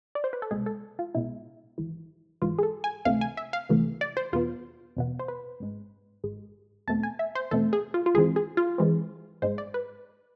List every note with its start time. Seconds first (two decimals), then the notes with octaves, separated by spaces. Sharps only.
0.15 D5
0.24 C5
0.33 B4
0.42 A4
0.51 C2 B2 G#3 G#4
0.66 A4
0.99 F4
1.14 C2 B2 G#3 E4
1.78 G#1 G#2 E3
2.42 G#1 G#2 E3 F4
2.58 G#4
2.63 A4
2.84 G#5
3.05 D2 C3 E3 A3 F5
3.21 G#5
3.37 E5
3.53 F5
3.69 D2 C3 E3 A3
4.01 D5
4.17 C5
4.32 E2 B2 B3 F4
4.96 E2 B2 B3
5.19 C5
5.28 B4
5.60 G#1 G#2 G#3
6.24 G#1 G#2 G#3
6.87 E2 B2 A3 C4 A5
7.03 G#5
7.19 E5
7.35 C5
7.51 E2 B2 A3 C4 A4
7.73 G#4
7.94 F4
8.06 F4
8.14 G#1 G#2 E3 G#3 C4 G#4
8.36 G#4
8.57 F4
8.78 G#1 G#2 E3 G#3 C4
9.42 G#1 G#2 G#3 C5
9.58 D5
9.74 B4